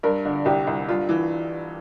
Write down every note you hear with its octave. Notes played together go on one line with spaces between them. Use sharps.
G2 A#4
D3
C2 G4
C2
G2 F4
E3